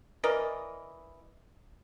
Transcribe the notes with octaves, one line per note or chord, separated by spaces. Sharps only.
E3 A#4 D5 D#5